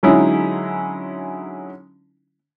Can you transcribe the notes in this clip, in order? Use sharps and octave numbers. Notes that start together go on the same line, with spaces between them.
D3 F#3 G#3 C#4 D#4 E4